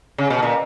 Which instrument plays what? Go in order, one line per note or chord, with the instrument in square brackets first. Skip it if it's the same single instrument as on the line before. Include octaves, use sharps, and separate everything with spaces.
[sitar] C#3
B2
A#2